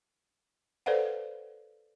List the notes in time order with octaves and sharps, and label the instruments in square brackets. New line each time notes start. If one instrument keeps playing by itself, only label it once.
[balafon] A4 B4 C5 D5 F5 F#5